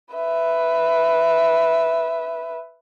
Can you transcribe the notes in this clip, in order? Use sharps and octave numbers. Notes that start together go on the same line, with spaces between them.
B4 E5